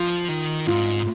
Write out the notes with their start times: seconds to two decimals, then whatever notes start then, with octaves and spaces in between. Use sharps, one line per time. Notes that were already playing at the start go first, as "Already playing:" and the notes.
Already playing: F3 F4
0.28 D#3
0.67 G#2 F4